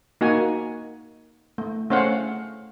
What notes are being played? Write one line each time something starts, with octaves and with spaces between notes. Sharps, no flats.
A#3 D#4 F#4 F#5 G#5
A3
A3 C#4 C5 F5 F#5